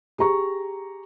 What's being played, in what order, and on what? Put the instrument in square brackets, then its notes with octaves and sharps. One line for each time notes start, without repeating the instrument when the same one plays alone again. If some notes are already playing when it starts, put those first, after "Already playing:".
[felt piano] G4 G#4 A#5 C#6